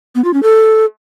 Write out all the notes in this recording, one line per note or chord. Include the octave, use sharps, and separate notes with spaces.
B3
F4
C#4
A4